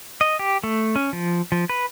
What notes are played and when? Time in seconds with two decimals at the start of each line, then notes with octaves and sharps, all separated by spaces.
0.21 D#5
0.39 G4
0.64 A3
0.96 C#4
1.13 F3
1.52 F3
1.70 B4